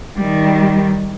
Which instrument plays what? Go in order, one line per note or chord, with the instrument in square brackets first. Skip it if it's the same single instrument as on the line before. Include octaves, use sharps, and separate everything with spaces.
[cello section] D#3 G3